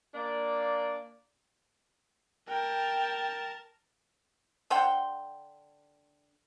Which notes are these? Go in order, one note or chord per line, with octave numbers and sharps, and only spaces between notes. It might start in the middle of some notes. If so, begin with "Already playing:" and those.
A#3 D4 D5
A#4 G5 A5
D3 C5 F#5 G5